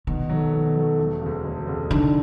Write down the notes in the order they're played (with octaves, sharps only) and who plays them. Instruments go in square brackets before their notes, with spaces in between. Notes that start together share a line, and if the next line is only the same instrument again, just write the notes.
[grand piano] B2 [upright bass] D#3
[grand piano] F#3 A3
B2
F#3 A3
E1
D2 C#3
E1
D2 C#3
[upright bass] D3 [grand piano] D#3